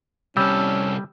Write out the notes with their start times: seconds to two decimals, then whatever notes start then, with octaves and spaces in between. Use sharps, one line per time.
0.37 C2 G3 C#4 A4 E6